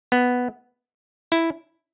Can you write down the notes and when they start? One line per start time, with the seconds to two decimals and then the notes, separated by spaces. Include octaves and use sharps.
0.12 B3
1.32 E4